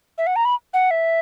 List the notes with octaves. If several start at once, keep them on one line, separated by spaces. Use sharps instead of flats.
E5
F#5
A#5
B5
F#5
E5